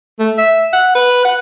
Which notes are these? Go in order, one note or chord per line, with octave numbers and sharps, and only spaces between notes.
A3
E5
F#5
B4
F#5